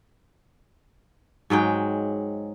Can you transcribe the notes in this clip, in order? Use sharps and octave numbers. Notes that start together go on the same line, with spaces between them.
G#2 F#3 G#3 G5